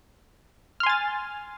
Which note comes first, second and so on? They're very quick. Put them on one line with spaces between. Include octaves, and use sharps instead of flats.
F6 C6 G#5 A6